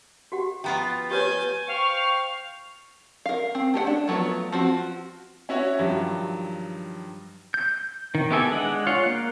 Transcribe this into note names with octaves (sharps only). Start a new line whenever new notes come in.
F#4 G4 F#5
F3 B3 F4 G5 A#5
G4 B4 C#5 G#5 G6 A6
C5 F5 G5 C#6
A#4 F5
C4
A3 G4 C5 F#5
D4
F3 F#3 A3 B3 F4
F3 C4 F#4
C#4 E4 F#4 C#5
G2 D#3 F3 F#3
G6
D#3
B3 E4 G4 A4 G#5
G#3 D4 F#5
F4 C#5 F5
A#3 F#6